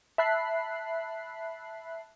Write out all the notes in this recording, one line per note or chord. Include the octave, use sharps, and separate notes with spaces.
E5 A5 B5 F#6 B6 C7